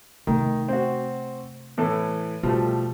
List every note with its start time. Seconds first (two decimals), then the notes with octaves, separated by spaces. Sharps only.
0.27 C3 D#3 A3
0.68 C4 F#4
1.78 A2 E3 A4
2.43 B2 F3 G3 A3